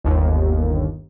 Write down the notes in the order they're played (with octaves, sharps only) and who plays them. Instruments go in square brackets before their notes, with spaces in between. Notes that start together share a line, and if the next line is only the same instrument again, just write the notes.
[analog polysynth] G1 D#2